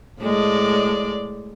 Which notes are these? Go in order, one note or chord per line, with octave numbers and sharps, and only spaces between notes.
A2 G#3 D5